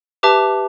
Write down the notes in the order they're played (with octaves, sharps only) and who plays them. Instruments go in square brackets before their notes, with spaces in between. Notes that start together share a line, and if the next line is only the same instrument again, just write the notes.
[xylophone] G4 B4 E5 A5 D6